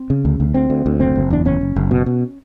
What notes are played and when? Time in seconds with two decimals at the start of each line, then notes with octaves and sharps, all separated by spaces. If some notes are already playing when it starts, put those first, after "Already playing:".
Already playing: C4
0.10 C#3
0.25 D2
0.40 D2
0.54 D2 C4
0.70 D2
0.86 D2
1.00 F#1 C4
1.15 F#1
1.30 E2 D4
1.45 F#1 C#4
1.61 F#1
1.76 F#1
1.91 B2
2.06 B2